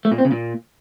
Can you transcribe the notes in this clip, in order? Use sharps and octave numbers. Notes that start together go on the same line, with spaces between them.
A3
A#2
C4
C#3
A#2